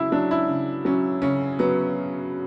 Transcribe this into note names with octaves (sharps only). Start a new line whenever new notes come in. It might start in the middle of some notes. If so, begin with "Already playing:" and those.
Already playing: C#3 F#3 E4
F#3 D4
E4
C#3
F#3 C#4
C#3 C#4
F#3 B3